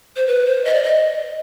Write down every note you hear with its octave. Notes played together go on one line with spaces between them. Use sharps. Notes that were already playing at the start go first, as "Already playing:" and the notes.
C5
B4
C5
D#5
D5
D#5